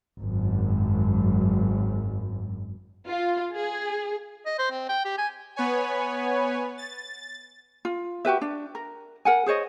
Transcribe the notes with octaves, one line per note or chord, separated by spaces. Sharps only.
G#1 F#2
F4
G#4
D#5
C5
C4
G5
G4
G#5
B3 B4 C#5 G#5
A6
F4
F#4 G4 B4 E5
D4
A#4
A#4 F#5 G#5
G#4 C5 C#5 D#5